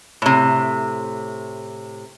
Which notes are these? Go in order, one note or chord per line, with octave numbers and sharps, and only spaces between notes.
A2 C3